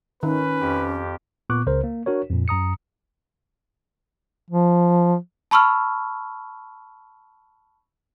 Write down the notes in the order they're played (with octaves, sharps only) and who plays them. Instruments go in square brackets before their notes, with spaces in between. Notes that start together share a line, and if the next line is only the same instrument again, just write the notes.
[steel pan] D#3 [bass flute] C#4 [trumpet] B4
[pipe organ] F2 G4
[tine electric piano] A#2 B3 C#6 D6 F#6
C#2 C#3 A#4 C5
A#3
D4 F#4 A#4 C#5
F2 A#2
F#2 A#5 D#6 C#7
[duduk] F3
[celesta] A5 B5 C#6 E6 F6